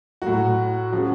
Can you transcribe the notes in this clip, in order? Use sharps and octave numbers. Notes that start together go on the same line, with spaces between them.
A2 F#3 F#4
C#3 F3 F#4